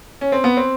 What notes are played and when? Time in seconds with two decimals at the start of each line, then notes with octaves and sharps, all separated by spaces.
0.21 C#4
0.32 C4
0.44 B3
0.57 C4